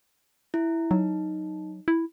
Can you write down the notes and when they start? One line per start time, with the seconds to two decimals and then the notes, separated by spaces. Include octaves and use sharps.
0.54 E4
0.91 F#3 D#4
1.88 E4